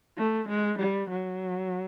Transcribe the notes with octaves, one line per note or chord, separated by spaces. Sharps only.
A3
G#3
G3
F#3